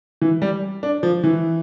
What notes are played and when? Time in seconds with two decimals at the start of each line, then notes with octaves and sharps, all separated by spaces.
0.22 E3
0.42 G3
0.83 D4
1.03 F3
1.24 E3